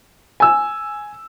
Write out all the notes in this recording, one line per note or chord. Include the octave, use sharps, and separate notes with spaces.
G#5 E6